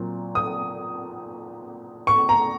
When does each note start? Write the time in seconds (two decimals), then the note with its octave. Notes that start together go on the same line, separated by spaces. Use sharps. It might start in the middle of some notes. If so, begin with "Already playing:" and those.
Already playing: A#2 F#3 C4
0.35 D#6
2.07 C#6
2.29 A#5